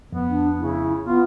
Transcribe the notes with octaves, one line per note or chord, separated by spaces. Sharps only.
F2 B3
D4
C#3 E4
B3 F4